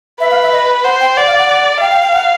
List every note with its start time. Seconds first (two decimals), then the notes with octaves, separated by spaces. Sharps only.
0.20 B4 E5
0.31 F5
0.42 E5
0.52 D#5
0.84 C5 F#5
1.00 G5
1.16 D5 F#5
1.27 F5
1.38 F#5
1.49 F#5
1.81 F5 G5
1.92 G5
2.03 G5
2.13 F#5